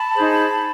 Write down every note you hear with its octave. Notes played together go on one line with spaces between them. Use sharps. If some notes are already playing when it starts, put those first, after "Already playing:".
Already playing: A5 B5
D#4 G#4 C5